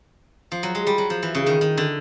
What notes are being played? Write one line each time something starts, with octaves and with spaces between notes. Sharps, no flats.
F3
F#3
G#3
G3
F#3
F3
E3
C#3
D#3
D#3
D3